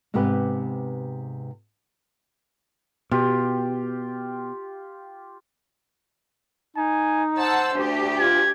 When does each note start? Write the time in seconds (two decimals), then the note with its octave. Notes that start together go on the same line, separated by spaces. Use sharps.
0.14 G#2 C3 B3 G4 B4
3.11 B2 F4 G4
6.77 D#4 G#5
7.38 C5 F#5 A5 E6
7.75 D2 G4
8.19 F4 G#6